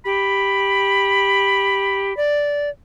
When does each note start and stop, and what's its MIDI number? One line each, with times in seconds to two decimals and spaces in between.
0.05 2.15 67
0.05 2.17 83
2.17 2.69 74